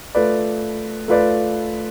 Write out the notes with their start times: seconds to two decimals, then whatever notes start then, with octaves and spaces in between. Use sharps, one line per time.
0.15 A3 F4 B4 D5
1.08 A3 F4 B4 D5